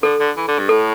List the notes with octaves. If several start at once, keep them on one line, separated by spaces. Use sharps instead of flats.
D3 A4
D3
E3
D3
G2
A2 A4